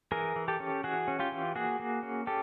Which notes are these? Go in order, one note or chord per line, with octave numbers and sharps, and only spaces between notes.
E3 G#4 A#4
E3
G4 A4
C#4
E3 F#4 G#4
C#4
F4 G4
E3
A#3 F#4 G#4
A#3
C#4
C#4 G4 A4